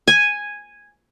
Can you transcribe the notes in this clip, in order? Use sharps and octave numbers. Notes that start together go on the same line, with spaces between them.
G#5